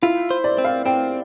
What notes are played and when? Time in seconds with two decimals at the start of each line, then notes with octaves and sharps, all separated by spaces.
0.02 E4 F4
0.31 C5
0.44 D5
0.58 C4
0.64 F5
0.86 C4 G5